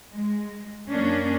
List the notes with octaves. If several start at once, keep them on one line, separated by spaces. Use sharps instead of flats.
G#3
F#2 A#3 C#4 D4